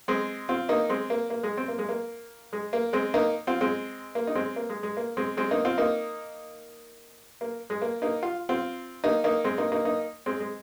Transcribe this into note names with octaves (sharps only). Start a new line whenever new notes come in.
G#3 C4
C4 F4
A#3 D#4
G#3 C4
A#3
A#3
G#3
C4
A#3
G#3
A#3
G#3
A#3
G#3 C4
A#3 D#4
C4 F4
G#3 C4
A#3
D#4
G#3 C4
A#3
G#3
G#3
A#3
G#3 C4
G#3 C4
A#3 D#4
C4 F4
A#3 D#4
A#3
G#3
A#3
A#3 D#4
F4
C4 F4
A#3 D#4
A#3 D#4
G#3 C4
A#3 D#4
A#3 D#4
A#3 D#4
G#3 C4
G#3